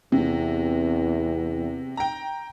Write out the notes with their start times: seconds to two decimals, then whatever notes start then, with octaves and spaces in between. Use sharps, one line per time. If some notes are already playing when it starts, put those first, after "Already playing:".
0.12 E2 C3
1.97 G5 A#5